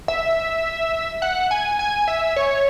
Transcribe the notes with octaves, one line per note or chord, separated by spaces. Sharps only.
E5
F#5
G#5
G#5
E5
C#5